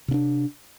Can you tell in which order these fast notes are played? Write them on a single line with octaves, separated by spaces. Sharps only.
C3 C#4 D4